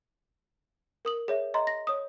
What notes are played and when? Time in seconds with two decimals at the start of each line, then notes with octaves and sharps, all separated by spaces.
1.05 A#4 D#6 F#7
1.28 G#4 C#5 E5
1.54 D#5 A#5 C6
1.67 A#6
1.87 C#5 D#6